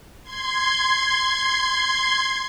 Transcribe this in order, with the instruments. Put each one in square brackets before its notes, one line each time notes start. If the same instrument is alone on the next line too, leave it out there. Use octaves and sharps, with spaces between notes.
[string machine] C6 G#6